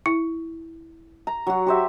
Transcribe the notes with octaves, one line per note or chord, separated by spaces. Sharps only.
E4
A#5
F#3 F#4
G4 C5 E5